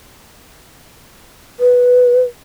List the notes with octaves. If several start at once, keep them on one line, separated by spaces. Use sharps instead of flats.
B4